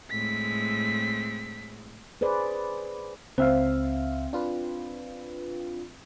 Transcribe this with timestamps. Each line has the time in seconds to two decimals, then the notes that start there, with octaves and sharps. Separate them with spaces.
0.10 A2 G#3 C4 B6
2.21 G#4 B4 C5 D5
3.38 C#2 C4 C5 E5 F5
4.33 D4 F4 B4